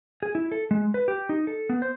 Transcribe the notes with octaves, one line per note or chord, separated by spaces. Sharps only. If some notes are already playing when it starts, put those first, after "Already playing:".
G#4
E4
A4
G#3
B4
G4
D#4
A4
B3
C5